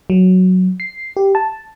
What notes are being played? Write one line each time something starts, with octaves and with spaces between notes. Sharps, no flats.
F#3
C7
G4
A5